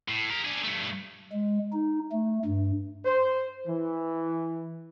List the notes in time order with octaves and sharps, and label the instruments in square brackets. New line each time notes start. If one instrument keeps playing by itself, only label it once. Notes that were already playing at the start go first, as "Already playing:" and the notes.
[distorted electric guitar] A2
G4 A#4
D4 G#4
G2 A3
[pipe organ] G#3
D#4
A3
G2
[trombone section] C5
E3